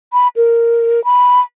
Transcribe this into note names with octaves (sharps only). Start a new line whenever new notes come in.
B5
A#4
B5